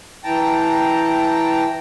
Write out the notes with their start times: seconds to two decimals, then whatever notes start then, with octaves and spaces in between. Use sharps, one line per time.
0.24 E3 G5 A5 A#5